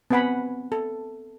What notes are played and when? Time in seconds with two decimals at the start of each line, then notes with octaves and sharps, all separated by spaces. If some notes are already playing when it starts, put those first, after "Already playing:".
0.10 B3 C4 B4 F#5 G#5 B5
0.72 A4